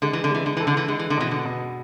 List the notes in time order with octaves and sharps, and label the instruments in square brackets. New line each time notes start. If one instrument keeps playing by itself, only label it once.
[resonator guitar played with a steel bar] D3 [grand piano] G#3
[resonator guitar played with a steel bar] E3
D3
[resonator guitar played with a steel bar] E3 [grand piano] G#3
[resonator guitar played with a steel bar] D3
[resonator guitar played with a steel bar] E3 [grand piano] A4
[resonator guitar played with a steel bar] D3
E3
[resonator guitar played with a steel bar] D3 [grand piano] G#3
[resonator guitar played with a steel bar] E3
D3
[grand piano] B2 [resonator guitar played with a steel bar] E3
[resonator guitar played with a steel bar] D3
[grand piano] B2